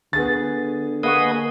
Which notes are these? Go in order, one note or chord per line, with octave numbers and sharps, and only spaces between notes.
D3 B3 G#4 A6
A#3 G#4 B4 D#5 F#5 C#6